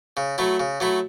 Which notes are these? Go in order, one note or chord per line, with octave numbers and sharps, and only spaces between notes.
C#3
F#3 A3 E4
C#3
F#3 A3 E4